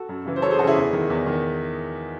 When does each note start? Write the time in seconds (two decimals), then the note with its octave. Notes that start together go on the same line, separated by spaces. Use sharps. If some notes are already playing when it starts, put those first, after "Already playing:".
Already playing: F#4 A4
0.09 F#2
0.25 C#3 E3
0.36 C5
0.42 F#2 A4 C#5
0.51 G#4 C5
0.59 C#3 E3 F#4 A4
0.67 E4 G#4
0.75 E2
0.93 D#3
1.10 E2
1.26 D#3